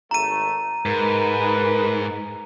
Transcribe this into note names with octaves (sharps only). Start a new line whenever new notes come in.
G#1 A3 A#5 D#7
G#2 A#4 B4